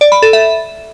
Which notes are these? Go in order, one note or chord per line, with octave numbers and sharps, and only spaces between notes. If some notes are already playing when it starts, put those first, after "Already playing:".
D5
B5
A4
E5